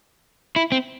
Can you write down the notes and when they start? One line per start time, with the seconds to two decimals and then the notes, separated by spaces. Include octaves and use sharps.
0.56 E4
0.72 C4